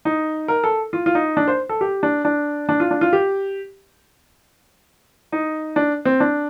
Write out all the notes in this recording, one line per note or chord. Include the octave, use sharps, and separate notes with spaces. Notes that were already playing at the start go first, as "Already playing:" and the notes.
D#4
A#4
A4
F4
F4
D#4
D4
C5
A4
G4
D4
D4
D4
F4
D4
F4
G4
D#4
D4
C4
D4